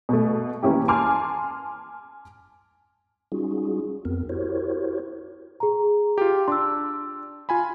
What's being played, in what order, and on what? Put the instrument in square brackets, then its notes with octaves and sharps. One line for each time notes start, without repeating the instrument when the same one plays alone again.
[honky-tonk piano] B2 A3
E3 A#3 C#4 E4 G4
G#5 A5 C6 D6 F6
[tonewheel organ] G3 C#4 D#4 F4 F#4 G#4
F2 B3 C4 A#4
E4 F#4 G4 A#4 C5 C#5
[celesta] G#4 A#5
[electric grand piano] F4 G4
[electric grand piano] D4 [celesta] C6 E6
[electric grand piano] F4 G#5 B5